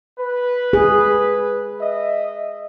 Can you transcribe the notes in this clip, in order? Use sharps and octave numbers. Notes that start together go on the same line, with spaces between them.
B4
G#4
D#5 E5